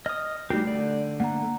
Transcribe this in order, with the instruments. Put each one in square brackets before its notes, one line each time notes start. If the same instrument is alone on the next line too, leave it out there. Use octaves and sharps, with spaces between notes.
[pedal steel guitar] D#5 D#6 [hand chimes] F6
[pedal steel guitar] G3 G4 [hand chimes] A3 C7 [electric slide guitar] D#4 F#4 A#4
[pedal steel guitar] D3 [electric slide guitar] D5
[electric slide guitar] A3 A#3 A4 [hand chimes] F#5 A#5